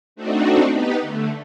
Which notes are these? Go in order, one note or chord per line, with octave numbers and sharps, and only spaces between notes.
A3 C4 D4 D#4 F#4
B3 D#4 G4 B4
D3 A3